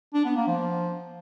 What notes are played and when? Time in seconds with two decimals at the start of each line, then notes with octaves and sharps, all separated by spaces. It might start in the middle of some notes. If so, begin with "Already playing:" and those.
0.14 D4
0.25 B3
0.36 A#3
0.47 F3